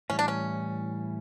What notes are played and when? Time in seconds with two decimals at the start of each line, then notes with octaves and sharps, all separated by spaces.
0.10 A2 E3 G3 C#4
0.19 D4
0.28 C#4